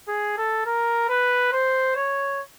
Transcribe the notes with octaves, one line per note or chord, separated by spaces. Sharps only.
G#4
A4
A#4
B4
C5
C#5